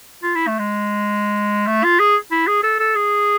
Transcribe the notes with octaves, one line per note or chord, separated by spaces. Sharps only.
F4
E4
A3
G#3
A3
F4
G#4
E4
G#4
A4
A4
G#4